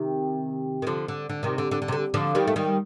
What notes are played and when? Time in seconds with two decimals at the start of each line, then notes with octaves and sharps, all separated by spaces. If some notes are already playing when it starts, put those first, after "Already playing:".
Already playing: C3 D#3
0.82 D#3
0.87 D3 F3
1.08 D3
1.29 D3
1.43 C3 D#3
1.58 D3
1.71 D3
1.82 D3
1.88 C3
1.92 D3
2.14 D3 F3
2.35 D#3 G3
2.47 A3
2.56 D#3 G3